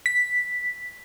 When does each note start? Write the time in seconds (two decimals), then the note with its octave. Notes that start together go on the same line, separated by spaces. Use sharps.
0.06 B6